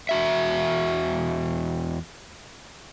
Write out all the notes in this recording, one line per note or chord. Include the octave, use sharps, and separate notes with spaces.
E2 F#4 E5